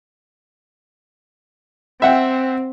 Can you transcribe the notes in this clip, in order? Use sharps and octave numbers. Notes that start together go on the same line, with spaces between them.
C4 E5 F#5 G5